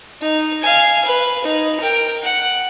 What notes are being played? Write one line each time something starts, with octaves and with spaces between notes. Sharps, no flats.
D#4
F5 G#5
B4
D#4
A#4 G5
F#5